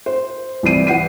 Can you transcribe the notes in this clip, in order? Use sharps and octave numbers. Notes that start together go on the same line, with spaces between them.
C5
C2 E3 D5 C7 D#7
E3 F#5 C7 D#7